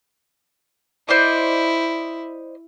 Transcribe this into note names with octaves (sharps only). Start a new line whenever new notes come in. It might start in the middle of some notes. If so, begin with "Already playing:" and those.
E4 C5 D5 D#5